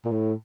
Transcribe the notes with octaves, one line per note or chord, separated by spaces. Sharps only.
A#2
A2